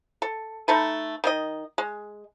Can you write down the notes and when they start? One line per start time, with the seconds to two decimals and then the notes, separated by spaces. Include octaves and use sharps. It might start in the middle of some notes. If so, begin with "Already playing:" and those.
0.22 A4
0.68 A3 D#4 A4 B4
1.24 D#3 G4 D#5
1.78 G#3